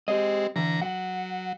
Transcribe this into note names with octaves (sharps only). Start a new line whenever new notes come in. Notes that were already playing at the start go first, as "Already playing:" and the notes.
G#3 C4 G4 D#5
D3 E3 A#5
F#3 F#5